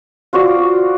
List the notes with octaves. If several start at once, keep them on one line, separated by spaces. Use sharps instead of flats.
F4 F#4 C5 D5